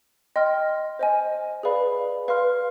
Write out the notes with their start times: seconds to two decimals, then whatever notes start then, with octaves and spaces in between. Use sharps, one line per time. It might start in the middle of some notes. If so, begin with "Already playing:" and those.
0.36 D#5 G5 C6 F6
0.99 C5 D#5 G#5
1.63 G#4 B4 D5 F5 B5
2.28 B4 F5 C6 F6